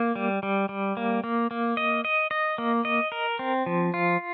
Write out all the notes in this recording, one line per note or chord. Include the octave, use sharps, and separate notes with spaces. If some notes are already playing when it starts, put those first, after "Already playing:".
Already playing: A#3
G3
G3
G3
A#3
A#3
A#3
D#5
D#5
D#5
A#3
D#5
A#4
C4
F3
F4